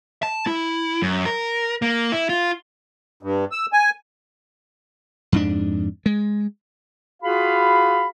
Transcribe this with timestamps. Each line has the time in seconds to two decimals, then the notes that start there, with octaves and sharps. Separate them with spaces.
0.23 A5
0.47 E4
1.02 F#2
1.26 A#4
1.82 A#3
2.12 E4
2.29 F4
3.23 G2
3.52 E6
3.73 G#5
5.32 F2 G#2 D4
6.06 G#3
7.23 F4 F#4 G#4 F5 B5